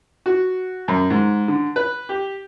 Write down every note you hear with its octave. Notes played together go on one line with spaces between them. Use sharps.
F#4
F#2
G#2
D3
B4
G4